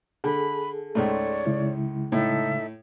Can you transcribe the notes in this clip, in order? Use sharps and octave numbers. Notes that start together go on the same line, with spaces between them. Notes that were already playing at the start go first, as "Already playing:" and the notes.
D3 G#4 A4 B5
C#2 G#2 A3 C#5 D5
C#3 G#3 E4
A2 D#4 A4 E5